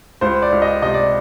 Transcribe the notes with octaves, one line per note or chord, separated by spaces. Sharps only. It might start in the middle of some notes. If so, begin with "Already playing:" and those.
C#2 C5
D5
C#2
D#5
C3 D#5
D5